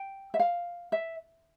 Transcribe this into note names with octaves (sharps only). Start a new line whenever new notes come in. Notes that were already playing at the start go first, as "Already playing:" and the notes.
Already playing: G5
E5
F5
E5